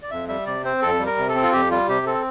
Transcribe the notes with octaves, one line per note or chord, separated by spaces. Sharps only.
D5
F2 E5
G3 E5
C3 D5
C4 C5
F2 A4
G3
A#4
C3
A4
C4
F4
F2 G4
G3 F4
C3 G4
C4 A4